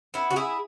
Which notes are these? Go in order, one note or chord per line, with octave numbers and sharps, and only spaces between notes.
B3 E4
F#4
E4 G#4